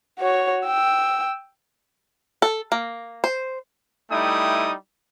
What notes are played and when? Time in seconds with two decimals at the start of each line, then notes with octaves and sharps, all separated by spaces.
0.19 F#4 C#5
0.66 G5 E6
2.42 A4
2.72 A#3
3.24 C5
4.11 G3 A3 D#4 E4 G5 D#6